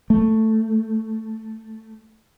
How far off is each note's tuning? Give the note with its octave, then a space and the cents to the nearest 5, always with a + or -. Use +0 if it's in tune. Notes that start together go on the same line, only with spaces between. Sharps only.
A3 +5